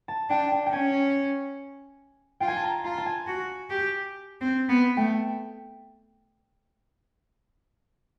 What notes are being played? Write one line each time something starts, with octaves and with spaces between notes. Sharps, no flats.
A5
D4 G5
G5
G5
C#4 G#5
F4 G5
G#5
A5
A#5
F4 A#5
A5
G#5
F#4
G4
C4
B3
A3 G5